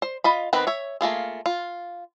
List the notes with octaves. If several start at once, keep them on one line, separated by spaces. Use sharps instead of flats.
C5
F4 D#5 B5
D#3 B3 C4 B4
C#5 E5
A3 A#3 F4 G#4
F4